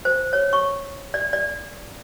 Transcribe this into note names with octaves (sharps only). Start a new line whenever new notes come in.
C5
C#5
C#6
D5
D5